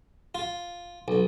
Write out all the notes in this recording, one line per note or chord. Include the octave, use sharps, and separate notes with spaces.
F4
B1